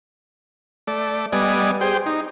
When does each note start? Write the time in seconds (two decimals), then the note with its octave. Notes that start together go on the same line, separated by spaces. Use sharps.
0.87 A3 D5
1.32 G3 B3 D5 D#5 G#5
1.81 G4 G#4 C5 G5
2.06 D#4